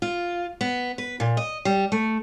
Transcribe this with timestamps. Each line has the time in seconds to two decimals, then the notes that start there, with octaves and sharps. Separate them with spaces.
0.02 F4
0.61 B3
0.98 B4
1.20 A#2
1.37 D#5
1.65 G3
1.92 A3